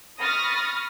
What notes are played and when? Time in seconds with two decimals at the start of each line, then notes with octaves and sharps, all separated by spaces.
0.19 B5 C#6 D#6 F6 A6 A#6